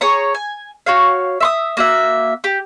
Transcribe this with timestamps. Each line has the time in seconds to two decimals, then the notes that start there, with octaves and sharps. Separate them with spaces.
0.01 G#4 C#5 A#5
0.35 G#5
0.86 F#4 C#5 F5
1.40 E5 C6 D#6
1.77 A#3 F#4 E5
2.44 G4